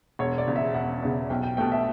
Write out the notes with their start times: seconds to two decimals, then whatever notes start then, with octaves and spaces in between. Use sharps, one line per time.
0.19 E1 C#5
0.38 D5
0.47 E2 C#3
0.56 E5
0.74 E1 F#5
1.02 E2 C#3
1.30 B1 G5
1.43 G5
1.57 B2 A3 G5
1.72 E5